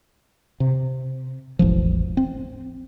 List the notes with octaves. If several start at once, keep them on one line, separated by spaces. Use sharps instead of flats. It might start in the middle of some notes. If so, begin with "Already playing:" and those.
C3
E1 A1 F3
C4